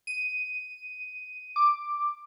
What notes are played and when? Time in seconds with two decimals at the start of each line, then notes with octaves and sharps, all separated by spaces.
0.07 D#7
1.56 D6